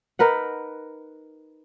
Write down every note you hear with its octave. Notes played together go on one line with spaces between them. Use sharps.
D#4 A#4 B4 F#5